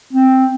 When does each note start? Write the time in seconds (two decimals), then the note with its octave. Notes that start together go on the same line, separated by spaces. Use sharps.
0.13 C4